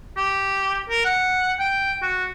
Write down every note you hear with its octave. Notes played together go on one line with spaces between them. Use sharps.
G4
A#4
F#5
G5
F#4